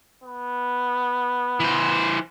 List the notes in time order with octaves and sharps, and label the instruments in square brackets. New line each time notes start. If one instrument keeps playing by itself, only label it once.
[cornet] B3
[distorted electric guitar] E3 C5